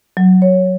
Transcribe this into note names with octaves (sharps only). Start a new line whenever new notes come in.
F#3
C#5